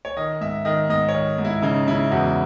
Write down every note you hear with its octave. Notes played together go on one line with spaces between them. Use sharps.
C#5
D#3 D#5
G#2 E5
D#3 D#5
G#2 D#5
C#5
D#3
G#2
E4
C#3 D#4
C#3 E4
E2 F#4